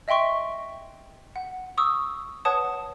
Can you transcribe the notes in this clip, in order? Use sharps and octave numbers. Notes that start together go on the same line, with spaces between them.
D#5 E5 G5 C6 C#6
F#5
C#6 D#6 E6
B4 C#5 F#5 A5 D#6